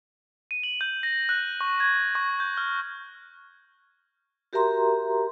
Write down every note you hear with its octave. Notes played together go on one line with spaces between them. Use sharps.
D#7
F#7
G6
A#6
F#6
C#6
G#6
C#6
G6
F6
F#4 G4 A#4 E5 A#5 C6